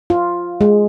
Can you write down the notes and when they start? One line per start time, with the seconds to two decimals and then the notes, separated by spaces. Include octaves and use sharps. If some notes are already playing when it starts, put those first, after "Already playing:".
0.10 F4
0.61 G#3